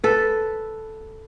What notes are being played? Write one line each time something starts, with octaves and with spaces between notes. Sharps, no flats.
A4 B4